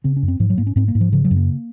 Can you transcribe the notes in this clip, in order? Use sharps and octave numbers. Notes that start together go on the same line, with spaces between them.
C#3 C4
C#4
F#2
C4
G#2 F3
F#3
G#2 A#3
C#4
G#2 C4
A#3
G#2
F3
C#3 F3
F#3
F#2
A#3